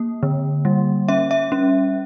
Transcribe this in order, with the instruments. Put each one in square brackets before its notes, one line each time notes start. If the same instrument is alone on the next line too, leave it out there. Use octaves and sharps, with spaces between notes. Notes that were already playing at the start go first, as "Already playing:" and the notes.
Already playing: [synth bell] A#3
D3
G3
C#4 E5
E5
C#4